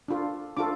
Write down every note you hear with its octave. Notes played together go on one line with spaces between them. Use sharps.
D4 F4 A4
D4 F4 A4 D6